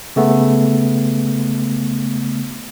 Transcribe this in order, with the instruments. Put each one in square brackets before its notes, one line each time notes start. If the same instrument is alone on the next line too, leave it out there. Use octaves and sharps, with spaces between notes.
[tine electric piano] C#3 A3 B3